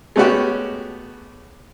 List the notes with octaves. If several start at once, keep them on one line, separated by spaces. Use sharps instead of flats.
G#3 A3 B3 C#4 F#4 G4